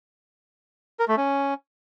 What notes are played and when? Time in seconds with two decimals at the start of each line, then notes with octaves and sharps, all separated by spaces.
1.00 A#4
1.08 A3
1.17 C#4